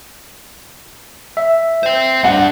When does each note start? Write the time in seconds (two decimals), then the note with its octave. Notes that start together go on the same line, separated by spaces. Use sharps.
1.37 E5
1.83 C5 G5
2.24 G3 D4 F#5